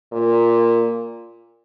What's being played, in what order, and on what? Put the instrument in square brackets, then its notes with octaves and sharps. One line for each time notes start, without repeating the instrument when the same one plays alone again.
[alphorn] A#2